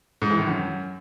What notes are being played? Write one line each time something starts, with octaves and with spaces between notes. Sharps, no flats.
G#2
E3
D#3
F#2